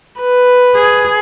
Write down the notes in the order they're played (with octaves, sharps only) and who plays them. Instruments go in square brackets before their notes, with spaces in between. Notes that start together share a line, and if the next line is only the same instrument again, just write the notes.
[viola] B4
[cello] G#4